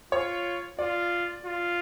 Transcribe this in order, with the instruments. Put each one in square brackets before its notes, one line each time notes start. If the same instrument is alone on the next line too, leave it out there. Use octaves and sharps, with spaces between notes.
[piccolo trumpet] F4 [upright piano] C#5
[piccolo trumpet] F4 [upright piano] D5
[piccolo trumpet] F4